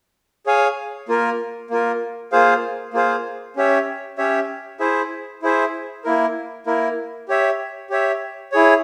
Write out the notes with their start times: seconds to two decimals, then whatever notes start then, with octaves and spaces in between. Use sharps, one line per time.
0.46 G#4 C#5 F5 G#5
1.09 A#3 F4 A#4
1.70 A#3 F4 A#4
2.32 A#3 F4 G#4 C5 F5
2.94 A#3 F4 G#4 C5 F5
3.56 C#4 G4 C#5 E5
4.18 C#4 G4 C#5 E5
4.80 E4 G#4 C5 E5
5.42 E4 G#4 C5 E5
6.04 A#3 E4 A#4
6.66 A#3 E4 A#4
7.28 G4 C#5 E5
7.90 G4 C#5 E5
8.52 E4 G#4 C#5